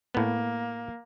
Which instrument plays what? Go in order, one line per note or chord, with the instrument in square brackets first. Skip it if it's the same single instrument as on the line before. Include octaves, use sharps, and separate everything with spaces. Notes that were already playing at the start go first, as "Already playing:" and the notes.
[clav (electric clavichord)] A2 B3 [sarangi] A#3